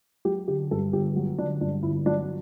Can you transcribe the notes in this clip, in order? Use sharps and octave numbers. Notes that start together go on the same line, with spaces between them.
F#3 G4
D3 G4
G2 A4
G1 G4
F#3
D3 D4
G2 D4
G1 E4
F#3 D4